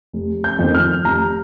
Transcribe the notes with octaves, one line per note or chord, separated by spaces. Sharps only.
F1
G6
F2 D#3
F6
F1 A#5